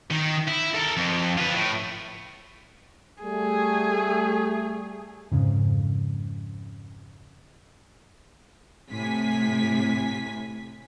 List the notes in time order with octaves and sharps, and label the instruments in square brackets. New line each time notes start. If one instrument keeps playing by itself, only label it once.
[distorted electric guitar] D#3
E4
A4 A#4
F2
F4 B4
A2
[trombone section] G3 A3 [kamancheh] G#4
[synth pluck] F2 G#2 C#3
[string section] A2 C3 G#5 B6